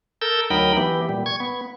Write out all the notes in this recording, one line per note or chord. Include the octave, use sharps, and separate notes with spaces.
A4 A#4 E6 G6
D2 F#3 D#4 A#4 G5 B5
E3 B3 G4
A#2 G3
C#6 G#6
B3